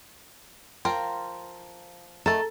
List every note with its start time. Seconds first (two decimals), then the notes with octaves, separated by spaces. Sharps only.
0.85 F3 F4 A#4 G5
2.26 D#3 A3 A4 A#5 A6